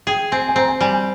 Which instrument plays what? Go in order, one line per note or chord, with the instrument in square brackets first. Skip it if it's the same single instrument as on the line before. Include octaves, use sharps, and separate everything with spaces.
[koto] G#4 [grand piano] G5
[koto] C4 [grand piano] G#5
[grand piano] G#5
[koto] C4 [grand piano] A#5
[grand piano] G#5
[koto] G3 [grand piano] G#5
[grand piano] G#5